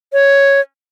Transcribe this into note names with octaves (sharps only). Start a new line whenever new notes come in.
C#5